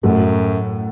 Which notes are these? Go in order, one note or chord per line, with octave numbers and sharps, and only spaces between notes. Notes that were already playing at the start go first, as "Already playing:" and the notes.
F#2 A2 F#3 A3